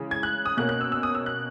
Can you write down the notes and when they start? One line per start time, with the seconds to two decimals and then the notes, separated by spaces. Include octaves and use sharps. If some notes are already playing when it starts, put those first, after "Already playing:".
Already playing: C#3 E3 G#3
0.11 G#6
0.23 F#6
0.46 D#6
0.57 B2 A#3 C#4 F#6
0.69 F#6
0.81 E6
0.92 E6
1.03 D#6
1.15 E6
1.26 F#6